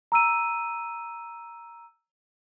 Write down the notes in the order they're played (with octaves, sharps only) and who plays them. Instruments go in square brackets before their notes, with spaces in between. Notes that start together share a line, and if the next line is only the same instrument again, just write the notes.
[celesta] A#5 E6 D#7